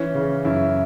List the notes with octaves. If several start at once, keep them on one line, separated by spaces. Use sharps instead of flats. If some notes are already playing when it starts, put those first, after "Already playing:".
Already playing: E3 C#4
C#3
F#2 E4